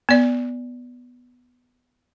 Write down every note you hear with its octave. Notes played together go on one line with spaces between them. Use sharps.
B3 D5